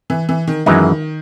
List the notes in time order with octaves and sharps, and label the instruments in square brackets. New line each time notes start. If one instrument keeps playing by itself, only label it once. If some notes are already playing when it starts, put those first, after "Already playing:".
[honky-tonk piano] E3
E3
D#3
[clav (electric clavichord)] F#2 E3 G#3 D#4 [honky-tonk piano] D#3